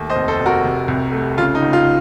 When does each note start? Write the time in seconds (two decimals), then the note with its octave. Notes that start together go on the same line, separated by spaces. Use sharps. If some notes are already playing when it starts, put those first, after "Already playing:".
Already playing: D#2 A3
0.10 C5 D#5
0.16 F1
0.28 A4 C5
0.39 F1
0.46 F#4 A#4
0.64 C3
0.88 C2
1.12 A3
1.38 C#3 F4
1.55 D#4
1.62 C#2
1.73 F4